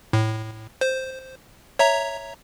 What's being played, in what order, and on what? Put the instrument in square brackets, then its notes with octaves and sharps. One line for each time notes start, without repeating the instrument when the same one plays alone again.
[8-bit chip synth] A2
C5
C#5 E5 A#5